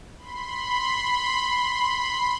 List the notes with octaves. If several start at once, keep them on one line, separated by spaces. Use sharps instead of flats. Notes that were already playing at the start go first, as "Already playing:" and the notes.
B5 C6